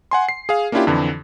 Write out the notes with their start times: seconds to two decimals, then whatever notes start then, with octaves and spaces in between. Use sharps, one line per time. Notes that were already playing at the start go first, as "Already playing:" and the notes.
0.11 F#5 G#5 C6
0.29 C7
0.49 G#4 F5
0.72 A#3 C#4 D4 E4 F4 G4
0.87 F2 D3 E3